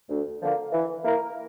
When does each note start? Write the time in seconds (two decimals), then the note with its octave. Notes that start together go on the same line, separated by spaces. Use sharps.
0.09 D2
0.41 D3 F3 A#3
0.73 E3
1.05 A#3 E4 A#4